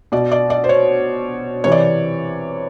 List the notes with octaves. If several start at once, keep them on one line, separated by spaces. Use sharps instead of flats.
B2 D5
D5
D5
C5
C#5
C3 E3 C#5
D5